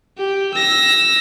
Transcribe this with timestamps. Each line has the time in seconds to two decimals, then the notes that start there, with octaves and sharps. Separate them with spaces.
0.17 G4
0.54 E6 A#6